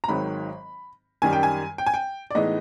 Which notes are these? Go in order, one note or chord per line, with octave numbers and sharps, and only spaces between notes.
A#5
G#1 G#2 D#3 F#3 B5
F#2 D#3 G3 G#5
G5
G#5
G5
G#5
G5
D5
A2 E3 G#3 B3 D#4 D#5